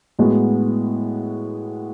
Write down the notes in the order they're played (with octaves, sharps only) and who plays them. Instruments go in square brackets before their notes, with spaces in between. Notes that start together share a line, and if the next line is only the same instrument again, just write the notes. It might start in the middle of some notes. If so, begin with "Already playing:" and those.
[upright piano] A2 G#3 B3 F#4